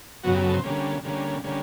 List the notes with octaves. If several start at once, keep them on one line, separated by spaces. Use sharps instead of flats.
F#2 C#3 F#3 B3 F#4
G4
A4
C5
D3 G3 A#3 C#4
D3 G3 A#3 C#4
D3 G3 A#3 C#4